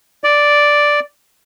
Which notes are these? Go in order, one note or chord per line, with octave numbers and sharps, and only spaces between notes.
D5